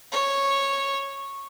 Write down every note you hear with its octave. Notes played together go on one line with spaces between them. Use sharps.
C#5